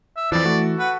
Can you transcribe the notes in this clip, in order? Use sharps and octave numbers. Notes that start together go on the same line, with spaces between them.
E5
F2 E3 F3 D5
A3 F#4 A4
B4 F#5